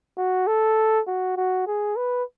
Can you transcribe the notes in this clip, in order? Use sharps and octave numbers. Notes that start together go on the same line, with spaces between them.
F#4
A4
F#4
F#4
G#4
B4